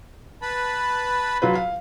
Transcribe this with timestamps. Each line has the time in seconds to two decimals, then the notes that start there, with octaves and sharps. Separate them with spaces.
0.42 B4 A5 B5
1.42 F#3 F4 B4
1.55 F5